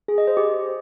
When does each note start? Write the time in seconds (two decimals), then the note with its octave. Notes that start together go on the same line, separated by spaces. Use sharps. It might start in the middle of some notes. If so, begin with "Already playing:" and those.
0.08 G#4
0.18 D#5
0.27 C5
0.37 G4